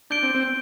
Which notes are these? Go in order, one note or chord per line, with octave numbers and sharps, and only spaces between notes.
D4 G6 D7 G7
C4
C4